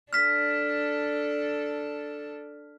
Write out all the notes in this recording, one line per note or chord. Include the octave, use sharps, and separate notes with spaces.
D4 A4 F6 B6